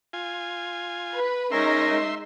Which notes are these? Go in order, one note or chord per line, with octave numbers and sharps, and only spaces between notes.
F4 G#5
B4
G#3 C#4 D#4 A#4 E5 C6